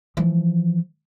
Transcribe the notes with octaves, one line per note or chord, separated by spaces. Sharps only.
E3 F3